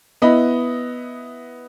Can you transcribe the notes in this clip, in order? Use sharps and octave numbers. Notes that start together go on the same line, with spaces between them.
B3 E4 D#5 B5